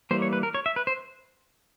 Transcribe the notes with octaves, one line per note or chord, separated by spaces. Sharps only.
E3 G3 A#3 C5
C#5
B4
A#4
C#5
E5
B4
C5